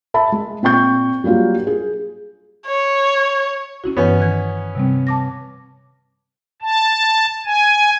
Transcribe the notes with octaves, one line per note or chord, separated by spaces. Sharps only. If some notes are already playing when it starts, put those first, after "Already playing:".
E5 A5 B5
G#3
A#2 C4 G5 C#6 G6
F#3 G3 A#3 F4 F#4
G#4
C#5
C#4 E4 F#4
G2 E3 B3 C#4
D#3 G#6
C3 G3 C4
A5 D6 A#6
A5
G#5